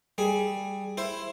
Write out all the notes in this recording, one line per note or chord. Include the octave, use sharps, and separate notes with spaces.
G3 G#4
E4 C5